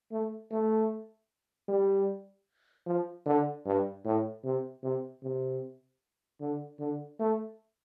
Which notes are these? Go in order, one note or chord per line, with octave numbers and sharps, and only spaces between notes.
A3
A3
G3
F3
D3
G2
A2
C3
C3
C3
D3
D3
A3